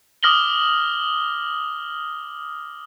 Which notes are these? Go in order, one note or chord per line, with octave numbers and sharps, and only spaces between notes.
D6 D#6 F6 A#6 F#7 G7